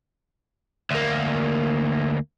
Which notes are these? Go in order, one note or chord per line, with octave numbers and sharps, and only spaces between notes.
D2 A#3